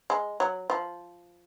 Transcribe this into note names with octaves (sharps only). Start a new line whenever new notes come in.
G#3
F#3
F3